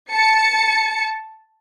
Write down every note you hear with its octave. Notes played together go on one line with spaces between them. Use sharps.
A5 C#7